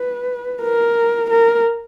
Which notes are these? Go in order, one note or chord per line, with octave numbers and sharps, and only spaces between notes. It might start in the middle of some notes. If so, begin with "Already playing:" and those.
Already playing: B4
A#4
A#4